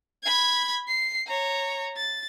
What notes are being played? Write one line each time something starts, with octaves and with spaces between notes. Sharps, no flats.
B5 G#6
C7
C#5 A#5
A6